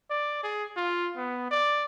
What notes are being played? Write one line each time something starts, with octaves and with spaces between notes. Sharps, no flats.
D5
G#4
F4
B3
D5